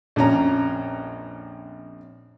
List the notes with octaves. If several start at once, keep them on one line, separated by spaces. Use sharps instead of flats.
A#1 F2 C#4 A#5